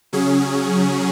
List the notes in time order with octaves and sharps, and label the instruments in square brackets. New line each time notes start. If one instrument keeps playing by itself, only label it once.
[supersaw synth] C#3 F#3 C#4 G#4